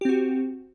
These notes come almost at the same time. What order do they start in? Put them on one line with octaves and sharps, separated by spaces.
G4 C4 F#4